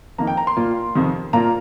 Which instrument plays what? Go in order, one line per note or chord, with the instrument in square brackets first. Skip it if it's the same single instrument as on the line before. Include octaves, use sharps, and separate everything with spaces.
[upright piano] F2 D#3 A#3 D#4 A#5
G5
A#5
C6
A#2 A#3 F4
F2 C3 D#3
A#2 A#3 F4 A#5